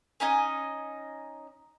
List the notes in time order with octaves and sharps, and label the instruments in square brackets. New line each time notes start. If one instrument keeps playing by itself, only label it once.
[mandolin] C#4 D#4 D#5 G#5